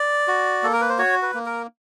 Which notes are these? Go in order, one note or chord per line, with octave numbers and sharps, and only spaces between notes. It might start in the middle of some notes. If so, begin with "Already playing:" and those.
Already playing: D5
F#4
A#3 A4
A#4
B4
C5
F#4 C#5
B4
A#3
A#4